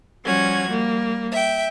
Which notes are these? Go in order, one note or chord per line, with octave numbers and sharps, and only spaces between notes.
F3 G3 C#4 F#4 G#6
G3 A#3
E5 G5